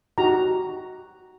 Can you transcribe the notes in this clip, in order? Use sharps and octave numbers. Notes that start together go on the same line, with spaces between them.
D#4 F#4 G4 A#5